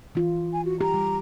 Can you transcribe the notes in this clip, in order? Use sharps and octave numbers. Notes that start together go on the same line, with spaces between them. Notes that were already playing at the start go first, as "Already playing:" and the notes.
E3 F4
G#5
F#4
G4 A#5
G3